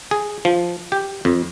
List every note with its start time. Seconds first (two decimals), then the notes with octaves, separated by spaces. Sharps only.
0.11 G#4
0.45 F3
0.92 G4
1.25 F2